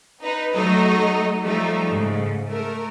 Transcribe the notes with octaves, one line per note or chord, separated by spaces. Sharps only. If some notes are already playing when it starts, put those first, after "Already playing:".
D#4 B4
F#3 A3 D#4 D#5
F3 G3 A3 D#4
G#2 C#3
A3 A#4